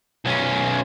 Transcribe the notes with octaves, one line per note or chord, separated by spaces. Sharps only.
B1 C#4